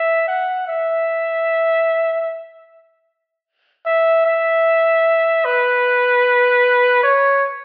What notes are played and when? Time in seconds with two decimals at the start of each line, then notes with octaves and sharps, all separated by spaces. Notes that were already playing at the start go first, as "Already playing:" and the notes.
Already playing: E5
0.28 F#5
0.68 E5
3.86 E5
4.26 E5
5.45 B4
7.03 C#5